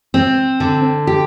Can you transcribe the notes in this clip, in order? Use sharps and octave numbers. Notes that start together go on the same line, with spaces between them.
C4
D3
G4